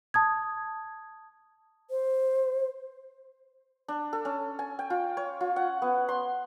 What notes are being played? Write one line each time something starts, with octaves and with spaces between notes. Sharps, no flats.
A5 D#6 G#6
C5
D4
A4
C#4
G#5
G5
F4
C#5
F4
F#5
B3
C6